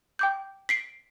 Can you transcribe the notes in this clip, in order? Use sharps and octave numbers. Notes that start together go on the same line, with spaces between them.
G5 D6 G6
B6 C7 D7